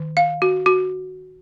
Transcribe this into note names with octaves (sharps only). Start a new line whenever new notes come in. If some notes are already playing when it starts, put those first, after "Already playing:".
Already playing: D#3
F5
F#4
F#4